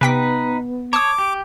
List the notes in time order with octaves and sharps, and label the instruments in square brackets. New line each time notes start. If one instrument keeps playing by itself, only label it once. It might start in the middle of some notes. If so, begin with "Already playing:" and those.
[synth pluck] C3 G5 B6 [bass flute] B3 [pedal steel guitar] D#4 B4
[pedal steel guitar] C#5 [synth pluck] A5 D#6 [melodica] D6
[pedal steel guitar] G4